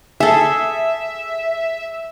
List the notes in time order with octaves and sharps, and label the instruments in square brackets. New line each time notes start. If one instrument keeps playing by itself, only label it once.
[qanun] G#4 A4 [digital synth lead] E5